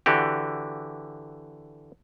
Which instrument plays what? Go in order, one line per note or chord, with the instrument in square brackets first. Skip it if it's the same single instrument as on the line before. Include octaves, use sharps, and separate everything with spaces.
[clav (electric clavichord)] D3 E3 F#4 G4